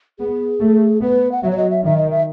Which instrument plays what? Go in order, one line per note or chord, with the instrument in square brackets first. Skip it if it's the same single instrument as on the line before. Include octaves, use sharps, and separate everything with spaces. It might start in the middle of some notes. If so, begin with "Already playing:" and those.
[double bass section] B3 [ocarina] G#4
[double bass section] A3
[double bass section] B3 [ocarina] B4
[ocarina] F#5
[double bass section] F#3 [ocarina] E5
[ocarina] C#5
D#5
E5
[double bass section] D#3 [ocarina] E5
[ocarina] D#5
E5